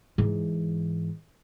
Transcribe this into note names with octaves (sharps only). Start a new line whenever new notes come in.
G#2 E3